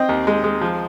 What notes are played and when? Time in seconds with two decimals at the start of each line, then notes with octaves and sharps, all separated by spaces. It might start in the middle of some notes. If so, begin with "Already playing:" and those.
Already playing: C4 D#5 G5
0.09 D#2
0.27 G#3
0.44 G#3
0.62 F3